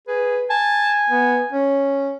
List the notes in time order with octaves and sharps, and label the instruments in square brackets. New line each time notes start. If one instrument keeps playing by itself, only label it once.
[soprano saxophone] G#4 [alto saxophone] B4
[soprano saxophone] G#5 [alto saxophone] A5
[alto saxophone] B3
C#4